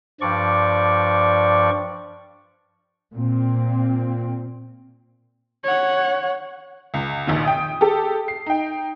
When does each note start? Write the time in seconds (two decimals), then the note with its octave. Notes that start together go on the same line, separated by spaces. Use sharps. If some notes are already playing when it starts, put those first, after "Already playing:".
0.21 G2 F3 D5 C#6
3.14 A#2 C4
5.64 C#5 F#5
6.94 C#2
7.27 A#1 D#2 D#3
7.45 G5 D#6
7.81 G4 A4
8.28 C7
8.46 D#4 G5